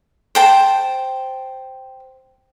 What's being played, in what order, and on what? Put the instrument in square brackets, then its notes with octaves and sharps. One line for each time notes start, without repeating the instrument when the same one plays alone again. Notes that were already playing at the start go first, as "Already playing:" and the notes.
[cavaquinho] C5 G5 A5